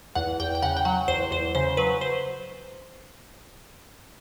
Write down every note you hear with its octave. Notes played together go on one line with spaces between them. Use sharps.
E2 F#5
E2 G5
G5
C#3 F#5
G5
F#3 F#5
E2 C5
E2 C5
C#3 C5
F#3 B4
C5